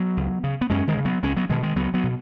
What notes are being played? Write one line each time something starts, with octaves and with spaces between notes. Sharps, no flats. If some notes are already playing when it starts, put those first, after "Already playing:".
Already playing: F#3 B3
C#2
C#3
B3
F#2 G#3 C#4
D#3 G#3
C#3
F#3 B3
C#2 G#3 C#4
F#3 B3
B2 D#3 G#3
D#3 G#3
C#2 F#3 B3
F#3 B3
B2